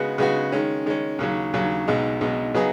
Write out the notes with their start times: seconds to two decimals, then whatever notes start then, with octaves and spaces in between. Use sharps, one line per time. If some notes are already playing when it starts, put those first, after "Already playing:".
Already playing: C#3 G#3 B3 F#4
0.18 C#3 G#3 B3 F#4
0.52 D#3 G#3 C#4
0.86 D#3 G#3 C#4
1.19 D#2 C#3 F#3
1.54 D#2 C#3 F#3
1.87 B1 B2 G#3 D#4
2.21 B1 B2 G#3 D#4
2.54 C#3 F#3 B3 D#4 G#4